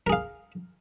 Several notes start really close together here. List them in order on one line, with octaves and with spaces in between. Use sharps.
A#4 G#4 F5